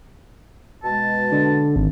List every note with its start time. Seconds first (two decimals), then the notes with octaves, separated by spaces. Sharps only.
0.84 B2 G#3 A5
1.32 D3
1.76 G#1